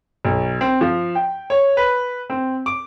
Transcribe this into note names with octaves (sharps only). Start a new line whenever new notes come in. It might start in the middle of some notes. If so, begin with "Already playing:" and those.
B1
C4
F3
G5
C#5
B4
C4
D6